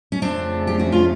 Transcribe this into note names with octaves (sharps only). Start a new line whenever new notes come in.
C#4
F2 C#3 F3 A3 C4 D4
G4
F#4
F4